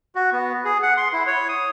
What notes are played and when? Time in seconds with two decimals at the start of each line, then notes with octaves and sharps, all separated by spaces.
0.15 F#4
0.33 B3
0.65 G#4
0.83 F#5
0.97 C6
1.13 E4
1.27 C#5
1.49 D#6